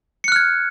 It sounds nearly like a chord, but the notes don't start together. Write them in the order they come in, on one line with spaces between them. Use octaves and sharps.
C#7 F#6 F6 G#6